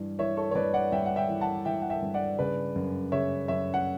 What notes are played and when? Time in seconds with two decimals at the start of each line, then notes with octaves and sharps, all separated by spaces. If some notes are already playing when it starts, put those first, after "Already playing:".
Already playing: G2 E3
0.19 E3 C#5 E5
0.37 A4 C#5
0.51 C#5
0.55 G2 B4 D5
0.74 D5 F#5
0.92 G2 E5 G5
1.06 F#5
1.16 E5 G5
1.29 E3
1.41 F#5 A5
1.65 E3 E5 G5
1.82 F#5
1.90 E5 G5
2.02 G2
2.14 D5 F#5
2.39 C#3 B4 D5
2.76 F#2
3.12 C#3 C#5 E5
3.48 F#2 C#5 E5
3.74 F#5